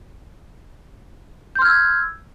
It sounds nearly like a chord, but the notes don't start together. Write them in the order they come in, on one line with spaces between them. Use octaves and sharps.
G6 C6 F6 G#6 E6